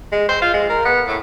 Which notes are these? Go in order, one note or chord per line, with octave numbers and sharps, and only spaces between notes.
G#3
C5
F4
G#3
A#4
B3
A2